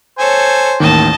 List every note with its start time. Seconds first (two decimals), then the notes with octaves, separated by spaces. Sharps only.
0.19 A4 C5 C#5 G#5
0.80 A1 D#2 D#3 D#5 A5